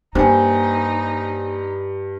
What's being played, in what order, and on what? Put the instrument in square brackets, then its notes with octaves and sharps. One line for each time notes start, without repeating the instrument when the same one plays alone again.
[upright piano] G2 [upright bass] A#3 [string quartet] D#4 [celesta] C5 G5 G#5